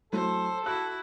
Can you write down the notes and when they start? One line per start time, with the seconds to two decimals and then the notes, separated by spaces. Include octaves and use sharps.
0.13 F#3 A3 E4 A4 C5
0.66 E4 F#4 F#6